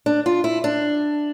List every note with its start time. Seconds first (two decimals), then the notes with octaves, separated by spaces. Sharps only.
0.06 D4
0.26 F4
0.44 E4
0.64 D4